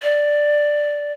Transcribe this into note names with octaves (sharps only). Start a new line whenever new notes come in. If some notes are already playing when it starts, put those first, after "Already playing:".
D5